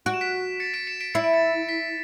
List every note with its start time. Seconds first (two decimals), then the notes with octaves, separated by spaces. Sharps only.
0.06 F#4 D7
0.14 E7
0.21 B6 D7
0.60 A6 C#7
0.74 B6 D7
0.87 C#7 E7
1.01 B6 D7
1.14 E4 C#7
1.24 D7
1.34 A6 C#7
1.69 B6